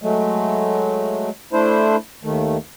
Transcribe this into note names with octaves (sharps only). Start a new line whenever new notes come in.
F#3 G#3 A3
A3 D4 E4 C5
D#2 D#3 A3